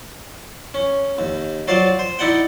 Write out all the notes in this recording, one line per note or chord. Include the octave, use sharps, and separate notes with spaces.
C#4
D#2
F#3 F4 C5 D5
C5
D#4 E4 D5 F#5 G5